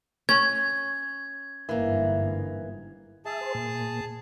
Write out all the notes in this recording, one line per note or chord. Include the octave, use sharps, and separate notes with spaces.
C#4 G#6
G1 G#2 E3 A#3
G#4 E5 A5
C5
A#2